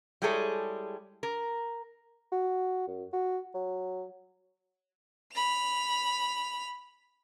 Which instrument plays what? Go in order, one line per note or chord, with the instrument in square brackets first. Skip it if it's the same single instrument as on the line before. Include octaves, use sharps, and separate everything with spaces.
[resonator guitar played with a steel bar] G3 G#3 E4 G#4 A4 C#5
A#4
[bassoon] F#4
F#2
F#4
F#3
[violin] B5 F7